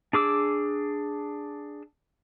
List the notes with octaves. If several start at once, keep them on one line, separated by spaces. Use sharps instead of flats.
D4 G#4 D6 E6